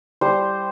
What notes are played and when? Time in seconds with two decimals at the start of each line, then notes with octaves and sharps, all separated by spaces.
0.21 G3 C5